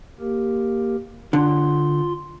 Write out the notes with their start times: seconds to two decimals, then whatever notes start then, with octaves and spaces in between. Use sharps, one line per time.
0.20 A#3 G4 A#4
1.33 D3 F4 C6